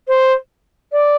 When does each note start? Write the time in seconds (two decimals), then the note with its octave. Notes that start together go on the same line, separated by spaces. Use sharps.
0.07 C5
0.92 D5